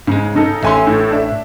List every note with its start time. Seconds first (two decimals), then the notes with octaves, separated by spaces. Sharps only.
0.07 G#2 C#3 G#3
0.35 C#3 D#4 A4
0.63 A1 C#4 A4 E5 G#5 C6
0.87 A2
1.11 D4 E5